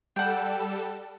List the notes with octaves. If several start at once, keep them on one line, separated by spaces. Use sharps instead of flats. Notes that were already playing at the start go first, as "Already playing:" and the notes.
G3 A4 F#5 G5 E7